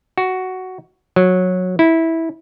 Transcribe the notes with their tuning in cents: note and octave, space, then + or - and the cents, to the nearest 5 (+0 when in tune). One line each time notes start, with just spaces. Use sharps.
F#4 +5
F#3 -15
E4 -15